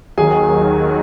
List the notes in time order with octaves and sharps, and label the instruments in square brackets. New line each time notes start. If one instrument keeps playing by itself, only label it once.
[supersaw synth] D#2 D#3 F#3 [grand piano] G#4 G#5